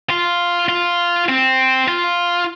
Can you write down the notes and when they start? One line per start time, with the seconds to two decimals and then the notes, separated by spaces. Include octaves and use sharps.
0.10 F4
0.69 F4
1.29 C4
1.88 F4